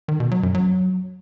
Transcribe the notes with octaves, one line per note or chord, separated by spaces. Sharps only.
D#3
B2
F#3
F#2
F#3